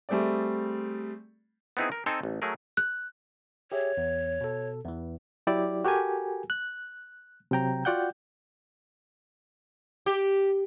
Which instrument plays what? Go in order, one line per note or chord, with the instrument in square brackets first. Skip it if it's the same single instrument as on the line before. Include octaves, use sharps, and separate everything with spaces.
[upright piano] G3 A3 C4 G#4 D5
[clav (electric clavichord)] B3 C4 D#4 E4 G#4
A#4
C4 D#4 A4 C5 G#5
A1
F#3 A3 G#4 A#4
[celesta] F#6
[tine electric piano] G4 G#4 E5 [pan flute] C#5
[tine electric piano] E2
B2 A4
E2 E3
[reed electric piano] F#3 E4 G4 D5
F#4 G4 A4 A#4 G#5
F#6
C3 F#3 G5 A#5
F4 F#4 D5 F#5 G5 G6
[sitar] G4